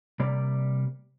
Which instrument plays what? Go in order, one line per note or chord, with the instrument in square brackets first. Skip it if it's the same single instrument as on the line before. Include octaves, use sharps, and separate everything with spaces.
[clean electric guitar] C3 G3 A#3 D5 B5